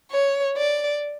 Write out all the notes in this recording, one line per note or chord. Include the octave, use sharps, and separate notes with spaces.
C#5
D5